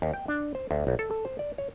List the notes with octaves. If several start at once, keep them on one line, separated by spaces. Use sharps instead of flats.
D#2
G5
D4
C5
D2
B1
A4
A4
C5
D5
C#5